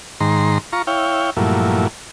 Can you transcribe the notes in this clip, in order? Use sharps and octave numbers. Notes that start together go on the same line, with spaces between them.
G#2 D#3 A#5 C6
F4 A#5 C#6
E4 C#5 F5 G5
G2 A#2 F3 F#3 A3 E4